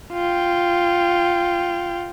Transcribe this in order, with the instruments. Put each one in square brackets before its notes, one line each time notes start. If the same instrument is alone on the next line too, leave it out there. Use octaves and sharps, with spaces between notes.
[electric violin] F4 G5